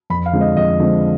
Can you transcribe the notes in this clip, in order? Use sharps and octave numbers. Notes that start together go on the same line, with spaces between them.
F2 B5
F5
D3 F3 G#3 C4
D#5
F2 D#5
D3 F3 G#3 C4